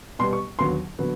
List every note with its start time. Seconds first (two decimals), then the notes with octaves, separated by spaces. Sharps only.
0.19 B2 G3 B3 C6
0.33 C#6
0.59 D#2 D3 F#3 B3 C6
0.99 D3 F#3 B3